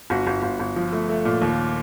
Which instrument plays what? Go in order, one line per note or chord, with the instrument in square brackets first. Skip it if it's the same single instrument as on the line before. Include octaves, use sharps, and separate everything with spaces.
[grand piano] G1 F#4
G1
G1
G1
F3
A3
A3
A#2
D#2